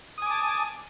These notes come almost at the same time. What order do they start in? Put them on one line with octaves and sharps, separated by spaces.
D#6 G#5 D6 A5